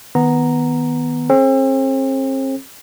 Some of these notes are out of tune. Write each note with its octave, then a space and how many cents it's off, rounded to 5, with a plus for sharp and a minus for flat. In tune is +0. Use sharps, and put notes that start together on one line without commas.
D#3 +10 B3 +0 A#5 +0
C4 +40 G#4 +45